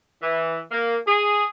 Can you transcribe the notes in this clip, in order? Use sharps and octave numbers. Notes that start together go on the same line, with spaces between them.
E3
A#3
G#4